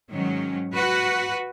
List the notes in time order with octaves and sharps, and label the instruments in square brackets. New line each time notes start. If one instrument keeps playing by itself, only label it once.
[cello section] G#2 D#3 F#3 C#4
F#4 B4